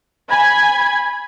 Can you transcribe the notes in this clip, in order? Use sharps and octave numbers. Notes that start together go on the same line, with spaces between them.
G#5 B5 G#6